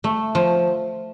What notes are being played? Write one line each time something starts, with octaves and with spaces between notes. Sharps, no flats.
A3
F3